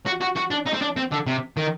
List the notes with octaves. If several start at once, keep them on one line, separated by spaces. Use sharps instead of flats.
F#4
F#4
F#4
D4
D#4
C4
D4
C4
D3
C3
D#3